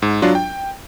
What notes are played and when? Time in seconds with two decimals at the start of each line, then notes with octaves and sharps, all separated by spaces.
0.02 G#2
0.22 F#3 D4 F4
0.35 G5